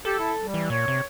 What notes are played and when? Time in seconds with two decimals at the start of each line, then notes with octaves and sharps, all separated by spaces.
0.05 G4 A4
0.19 E4
0.40 G3
0.54 E3
0.70 A#2 C#5
0.88 C3